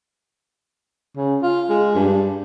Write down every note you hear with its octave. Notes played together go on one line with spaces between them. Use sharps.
C#3
F4
G#3
G2